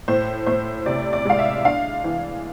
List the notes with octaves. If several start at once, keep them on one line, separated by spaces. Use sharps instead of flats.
A2 C5
A2 C5
C3 D5
D5
G#3 F5
E5
D4 F5
E3